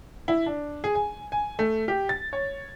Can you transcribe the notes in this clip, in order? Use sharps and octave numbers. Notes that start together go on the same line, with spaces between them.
E4
D4
G#4
G#5
G#5
A3
G4
A6
C#5